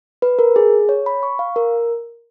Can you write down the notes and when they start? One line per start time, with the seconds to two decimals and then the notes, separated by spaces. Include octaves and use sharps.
0.22 B4
0.39 A#4
0.56 G#4
0.89 C#5
1.06 B5
1.23 C#6
1.39 F5
1.56 A#4